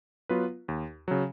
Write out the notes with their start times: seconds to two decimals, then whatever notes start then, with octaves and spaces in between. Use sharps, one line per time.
0.29 F#3 B3 F4 B4
0.68 D#2
1.08 C#3 F#3